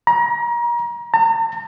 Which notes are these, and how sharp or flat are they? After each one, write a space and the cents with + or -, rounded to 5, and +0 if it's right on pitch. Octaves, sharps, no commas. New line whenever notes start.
A#5 +30
A#5 -45